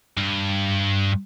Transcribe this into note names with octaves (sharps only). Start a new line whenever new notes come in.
G2